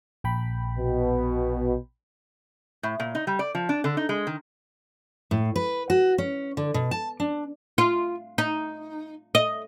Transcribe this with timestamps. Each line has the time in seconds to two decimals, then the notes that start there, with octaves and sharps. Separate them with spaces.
0.24 A#1 G5 B5
0.77 B2
2.83 A2
3.00 A#2
3.15 D#4
3.27 G3
3.39 D5
3.55 F3
3.69 D4
3.84 D3
3.97 D#4
4.09 G#3
4.27 D#3
5.31 A2
5.56 B4
5.90 F#4
6.18 C#4
6.57 D3
6.74 B2
6.91 A5
7.20 D4
7.78 F4
8.38 D#4
9.35 D#5